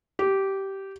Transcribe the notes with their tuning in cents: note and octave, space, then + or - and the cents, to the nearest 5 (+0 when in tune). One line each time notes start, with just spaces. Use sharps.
G4 -15